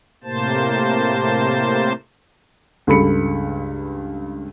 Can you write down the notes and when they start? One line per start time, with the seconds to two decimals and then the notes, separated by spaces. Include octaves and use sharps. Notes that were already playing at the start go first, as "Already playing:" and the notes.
0.24 A2 C3 A#3 C5 A5
2.87 C#2 G2 A4 B5 C#7